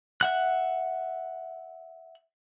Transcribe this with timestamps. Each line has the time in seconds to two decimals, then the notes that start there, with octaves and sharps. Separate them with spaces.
0.21 E5 F#5 F#6